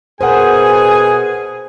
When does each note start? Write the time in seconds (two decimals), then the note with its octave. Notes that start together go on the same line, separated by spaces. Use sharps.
0.21 B2 G#4 A#4 C5 F#5 G#5